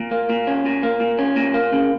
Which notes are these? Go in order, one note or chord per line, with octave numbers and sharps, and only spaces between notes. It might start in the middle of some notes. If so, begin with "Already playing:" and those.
Already playing: A#2
A#3
A#2
C#4
A#2
A#3
A#2
C#4
A#2
A#3
C#3